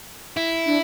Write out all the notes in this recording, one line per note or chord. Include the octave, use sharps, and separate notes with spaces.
E4
D4